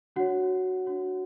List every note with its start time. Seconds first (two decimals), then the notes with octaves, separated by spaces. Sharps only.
0.16 D4 F#4 C#5 F#5
0.86 D4 F#4 C#5